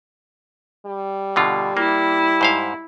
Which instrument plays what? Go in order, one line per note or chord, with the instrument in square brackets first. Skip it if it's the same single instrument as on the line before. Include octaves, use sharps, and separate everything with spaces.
[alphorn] G3
[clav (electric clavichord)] B2 D3 F4
[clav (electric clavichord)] A#3 [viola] E4
[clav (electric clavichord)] G#2 C5 F5